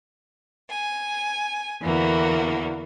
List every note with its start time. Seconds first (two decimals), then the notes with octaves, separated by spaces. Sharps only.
0.69 G#5
1.81 E2 D3 E3 A#3 F#4